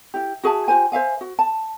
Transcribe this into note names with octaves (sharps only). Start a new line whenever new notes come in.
E4 G4
F#4 G#4 E5 A5
F4 G4 C5 G#5
C5 E5 F5 G#5
F#4
A5